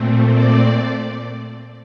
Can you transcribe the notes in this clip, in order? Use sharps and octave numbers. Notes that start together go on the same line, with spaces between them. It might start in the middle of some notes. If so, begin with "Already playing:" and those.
Already playing: A#2 A3 C4
D5